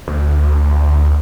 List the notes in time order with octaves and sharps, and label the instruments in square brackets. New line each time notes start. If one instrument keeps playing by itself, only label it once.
[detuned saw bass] D2